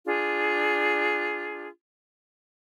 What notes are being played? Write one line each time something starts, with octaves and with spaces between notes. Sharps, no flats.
D4 F4 G#4